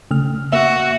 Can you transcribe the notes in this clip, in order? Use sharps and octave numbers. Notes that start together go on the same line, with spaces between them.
C#3 A3 F6
A#3 F#4 E5 E7